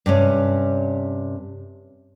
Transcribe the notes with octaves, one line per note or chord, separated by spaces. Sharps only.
G2 C3 C#4